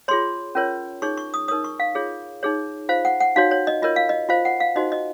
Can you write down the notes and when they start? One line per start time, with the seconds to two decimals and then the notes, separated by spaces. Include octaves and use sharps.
0.08 F4 G#4 C#5 C6
0.55 C#4 F4 A#4 C#5
1.02 D#4 G#4 C#5 C#6
1.17 C#6
1.34 D#6
1.48 D#4 A#4 C#5 D#6
1.64 C#6
1.80 F5
1.95 F4 G#4 C#5
2.43 D#4 G#4 C#5
2.89 F4 C5 F5
3.05 F#5
3.20 F#5
3.36 D#4 F#4 C#5 F5
3.51 C#5
3.67 D#5
3.82 F4 A#4 C#5 D#5
3.96 F5
4.09 D#5
4.29 F4 C5 F5
4.45 F#5
4.60 F5
4.76 D#4 F#4 C5 D#5
4.92 D#5